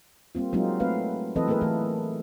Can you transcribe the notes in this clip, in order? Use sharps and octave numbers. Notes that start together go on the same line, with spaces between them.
G3 A#3 C4 F4
F#3 G#3 A#3 C4 D#4 F4
A3 C4 B4 F5
E3 F#3 C4 A4 B4 D#5
A3 A#3 G#4 A#4 B4
E3 A3 A4